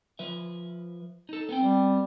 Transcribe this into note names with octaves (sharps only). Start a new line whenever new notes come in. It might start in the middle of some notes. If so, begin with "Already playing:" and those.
F3 B4 E5
D#4 A4
B3 C4 G5
G3